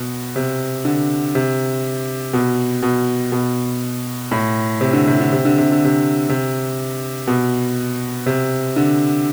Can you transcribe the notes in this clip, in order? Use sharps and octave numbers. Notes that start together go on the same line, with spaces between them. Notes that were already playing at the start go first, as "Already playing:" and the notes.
Already playing: B2
C3
D3
C3
B2
B2
B2
A2
C3
D3
C3
D3
C3
D3
C3
D3
C3
C3
B2
C3
D3